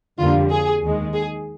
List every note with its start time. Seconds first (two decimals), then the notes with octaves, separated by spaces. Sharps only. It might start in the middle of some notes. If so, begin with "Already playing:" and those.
0.19 F2 D3 G3 A#3 F4
0.50 G#4
0.83 D#2 D#3 G#3
1.14 G#4